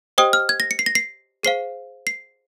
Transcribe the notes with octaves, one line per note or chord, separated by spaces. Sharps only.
G4 C5 D#5 G5 D#6
F6
G#6
A#6
C#7
C7
A#6
C7
G#4 C5 F5 C7
C7